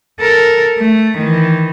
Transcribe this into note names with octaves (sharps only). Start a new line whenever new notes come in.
A4 A#4
A3
D#3 E3